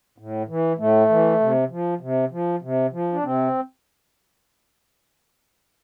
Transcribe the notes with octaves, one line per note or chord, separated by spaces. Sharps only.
A2
E3
A2 A3
E3
C3
F3
C3
F3
C3
F3
D4
C3 C4